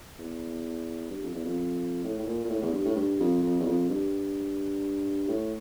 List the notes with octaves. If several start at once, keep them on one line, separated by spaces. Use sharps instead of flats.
E2
G2
F2
E2
F2
A2
A2
A#2
A#2
A2
E2
G2
A2
G2
F2
F2
E2
F2
G2
A2